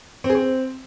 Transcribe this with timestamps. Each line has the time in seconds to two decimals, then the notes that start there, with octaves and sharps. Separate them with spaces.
0.24 C4
0.30 G#4
0.35 C4